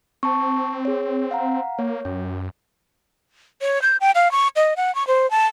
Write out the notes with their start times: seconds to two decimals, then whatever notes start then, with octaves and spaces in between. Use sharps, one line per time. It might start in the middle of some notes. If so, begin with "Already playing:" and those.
0.23 C4 A5 C#6
0.85 G#4 C#5
1.31 F5 F#5 A#5
1.79 A#3 C#5
2.05 F#2 C#4
3.62 C#5
3.82 G6
4.01 G5
4.15 F5
4.32 C#6
4.56 D#5
4.77 F#5
4.95 C#6
5.07 C5
5.31 A5